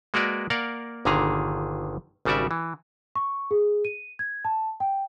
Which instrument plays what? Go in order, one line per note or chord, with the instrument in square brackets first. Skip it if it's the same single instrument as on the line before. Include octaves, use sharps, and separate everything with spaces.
[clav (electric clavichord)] G#3 A#3 F#4 A#4 B4 D5
A#3 A#4 D5 F5 F#5
G1 A#2 D3 D#3 G#4 A#5
G#1 C#3 G3 F#4 D5 E5
E3
[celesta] C#6
G#4
D#7
G#6
A5
G5